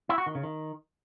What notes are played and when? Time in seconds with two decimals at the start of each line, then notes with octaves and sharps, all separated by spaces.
0.09 E4
0.18 F#4
0.26 D#3
0.35 C#3
0.43 D#3